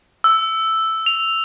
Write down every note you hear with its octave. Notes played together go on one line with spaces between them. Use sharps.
E6
F7